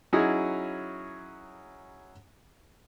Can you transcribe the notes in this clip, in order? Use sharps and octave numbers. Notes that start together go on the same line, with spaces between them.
F#3 C#4 D#4 E4 F#4 G#4